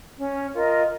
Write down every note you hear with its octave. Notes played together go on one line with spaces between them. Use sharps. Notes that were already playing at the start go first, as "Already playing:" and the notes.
C#4
F4 A#4 D#5